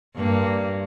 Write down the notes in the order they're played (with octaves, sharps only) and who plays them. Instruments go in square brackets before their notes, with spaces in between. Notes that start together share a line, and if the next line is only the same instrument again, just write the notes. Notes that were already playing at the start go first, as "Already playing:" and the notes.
[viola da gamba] G2 A#3